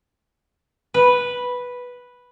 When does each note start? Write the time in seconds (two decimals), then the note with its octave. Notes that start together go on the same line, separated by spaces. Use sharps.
0.94 B4